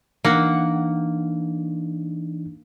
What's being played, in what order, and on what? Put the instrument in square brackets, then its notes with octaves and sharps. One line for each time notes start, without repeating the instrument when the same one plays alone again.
[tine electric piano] E3 D4 D#4 [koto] A#3 F#5